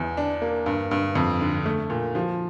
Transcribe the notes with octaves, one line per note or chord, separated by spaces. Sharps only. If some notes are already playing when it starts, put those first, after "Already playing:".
Already playing: E2
D4
A#3
G2
G2
F2
D3
A3
A#2
F3